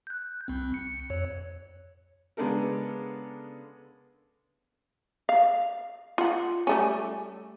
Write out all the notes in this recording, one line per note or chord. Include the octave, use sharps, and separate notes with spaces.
F#6 G6
C2 C4
C#7
F2 C#5
C#3 G#3 B3 D4 A4 A#4
F5
F4 F#5
G3 A3 C#4